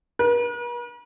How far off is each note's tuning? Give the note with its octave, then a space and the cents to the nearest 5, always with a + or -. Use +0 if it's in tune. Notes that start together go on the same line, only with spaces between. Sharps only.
B4 -45